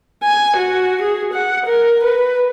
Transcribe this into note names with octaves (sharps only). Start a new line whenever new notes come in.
G#5
F#4
G#4
F#5
A#4
B4